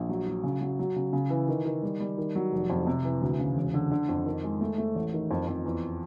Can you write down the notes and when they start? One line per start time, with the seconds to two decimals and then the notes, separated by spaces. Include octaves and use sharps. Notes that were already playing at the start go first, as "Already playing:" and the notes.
Already playing: A#1
0.09 F#3
0.27 F#3
0.44 C#3
0.61 F#3
0.79 F#3
0.96 C#3
1.13 C#3
1.30 E3
1.48 D#3
1.65 D#3
1.83 G3
2.00 G3
2.18 D#3
2.35 F#3
2.52 F1
2.70 F2
2.87 C3
3.05 E3
3.22 D2
3.39 C#3
3.56 E1
3.74 D3
3.91 D3
4.09 F2
4.26 D#3
4.44 G#3
4.61 A3
4.78 A3
4.95 A1
5.13 D#3
5.31 F2
5.47 F2
5.65 E2